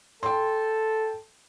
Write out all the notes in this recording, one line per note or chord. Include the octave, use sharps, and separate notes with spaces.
A4 G5 C6